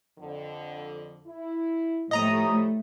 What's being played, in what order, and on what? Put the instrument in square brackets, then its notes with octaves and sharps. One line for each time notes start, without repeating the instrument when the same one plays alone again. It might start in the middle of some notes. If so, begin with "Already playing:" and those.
[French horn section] F2 D3
E4
[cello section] A2 A3 [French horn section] F3 G3 C#5 [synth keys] D#5 A#5 D#6